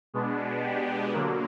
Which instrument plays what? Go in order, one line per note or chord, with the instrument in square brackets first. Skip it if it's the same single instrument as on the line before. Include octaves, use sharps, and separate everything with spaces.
[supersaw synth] B2 G#3 B3 D4
G4
D3 F#3 A#3